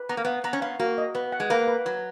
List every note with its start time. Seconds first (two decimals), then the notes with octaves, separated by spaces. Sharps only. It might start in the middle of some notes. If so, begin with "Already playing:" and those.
Already playing: B4
0.09 B3 A#5
0.17 A#3
0.25 B3 F5
0.44 B3 A#5
0.53 C#4
0.62 B3 F5
0.80 A#3 F#4
0.98 D#5
1.15 B3 B4
1.32 F#5
1.40 G#3
1.50 A#3 B4
1.68 B4
1.86 F#3 B4